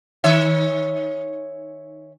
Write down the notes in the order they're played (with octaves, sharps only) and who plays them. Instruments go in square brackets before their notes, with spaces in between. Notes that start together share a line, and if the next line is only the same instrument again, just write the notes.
[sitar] D#3 C#5 E5